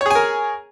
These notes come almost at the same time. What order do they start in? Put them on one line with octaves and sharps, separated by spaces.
C#5 G#4 G#5 A#4